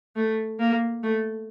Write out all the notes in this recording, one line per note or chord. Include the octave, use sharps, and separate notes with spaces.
A3
A#3
A3